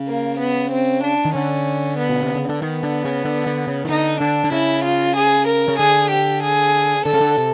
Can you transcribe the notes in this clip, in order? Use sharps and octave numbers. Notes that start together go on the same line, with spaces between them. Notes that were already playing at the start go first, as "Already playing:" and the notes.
Already playing: C#3
A#3
B3
C4
D4
D#3
D3 C#4
B3
B2
C3
C#3
D3
D#3 B3
D3
C#3
D3
D3
C#3
D#3
D3 D#4
D3 D4
D3
C#3 E4
F4
G#4
A#4
C#3
D3 G#4
G4
G#4
D3 A4
C#3
D3
C3